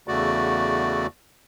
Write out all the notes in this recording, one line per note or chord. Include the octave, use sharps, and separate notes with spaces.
E2 C#3 A3 F#4 D5